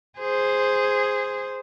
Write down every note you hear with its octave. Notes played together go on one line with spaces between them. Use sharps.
G#4 C5